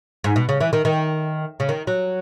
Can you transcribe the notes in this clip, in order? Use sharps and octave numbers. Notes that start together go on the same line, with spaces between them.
G#2
B2
C#3
E3
D#3
D#3
C#3
D#3
F#3